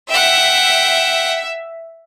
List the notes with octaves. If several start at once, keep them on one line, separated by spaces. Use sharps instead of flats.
E5 F#5 G5